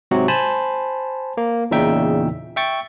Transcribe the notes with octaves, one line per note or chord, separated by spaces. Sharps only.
G#2 C3 F#3 F#4 G4
C5 G#5 A5 B5
A#3
E2 A#2 C#3 D#4 E5 G5
E5 G5 C#6 A6